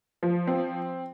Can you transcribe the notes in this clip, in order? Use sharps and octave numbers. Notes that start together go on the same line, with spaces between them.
F3
C4